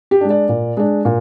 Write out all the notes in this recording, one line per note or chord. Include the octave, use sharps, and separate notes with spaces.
G4
G#3 D4
D5
A#2
G#3 D4
A#2